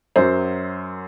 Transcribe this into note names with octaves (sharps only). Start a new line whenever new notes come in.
F#2 F#3 C5